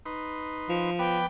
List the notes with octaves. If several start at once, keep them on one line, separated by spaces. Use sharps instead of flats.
D#4 B4 C6
F3
B3 B4 D5 G5